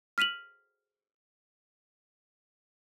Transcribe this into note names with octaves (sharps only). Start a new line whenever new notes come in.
F6 B6 D#7 F7 F#7